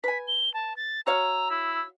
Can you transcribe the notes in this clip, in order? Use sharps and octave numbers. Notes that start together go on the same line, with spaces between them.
B4 G#5 B6
G7
A5
A6
F#4 C#5 F5 A#5 E6
E4